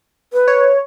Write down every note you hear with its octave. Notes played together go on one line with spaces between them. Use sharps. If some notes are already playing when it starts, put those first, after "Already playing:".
B4
C#5